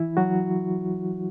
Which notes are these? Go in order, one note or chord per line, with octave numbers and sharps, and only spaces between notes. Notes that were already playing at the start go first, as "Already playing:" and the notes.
Already playing: E3 E4
F#3 F#4